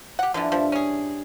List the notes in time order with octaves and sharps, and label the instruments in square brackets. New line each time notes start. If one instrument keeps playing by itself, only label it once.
[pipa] G4 F#5
[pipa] D3 E3 [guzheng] F3 D4 E4
[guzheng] G2 E5 [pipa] F3
[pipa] C#4 G#4